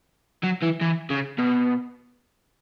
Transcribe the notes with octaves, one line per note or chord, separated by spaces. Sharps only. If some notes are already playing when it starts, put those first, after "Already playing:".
F#3
E3
E3
C#3
B2